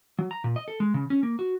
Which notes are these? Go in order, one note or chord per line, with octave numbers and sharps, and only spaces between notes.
F#3
A#5
A#2
D#5
A4
G#3
C#3
C#4
A#3
F#4